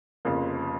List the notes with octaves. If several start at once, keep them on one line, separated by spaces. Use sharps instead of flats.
F1 F2 C#3 F3 A#3